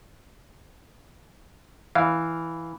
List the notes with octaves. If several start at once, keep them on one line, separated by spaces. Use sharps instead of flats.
E3 F5